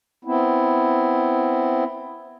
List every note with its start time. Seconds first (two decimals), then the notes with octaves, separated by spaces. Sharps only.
0.25 B3 C4 E4